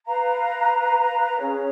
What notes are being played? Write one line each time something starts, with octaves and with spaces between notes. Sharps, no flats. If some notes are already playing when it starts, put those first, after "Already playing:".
B4 F5 A#5
C#4 G#4 C#5